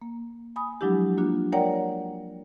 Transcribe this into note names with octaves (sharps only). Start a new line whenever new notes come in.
A#3
G#5 B5 D#6
F3 F#3 G#3 D4 E4 G4
A#3 D4 F4 F#4
A#4 C#5 D5 F#5 G5 A#5